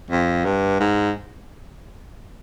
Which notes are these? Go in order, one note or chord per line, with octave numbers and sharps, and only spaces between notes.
F2
G2
G#2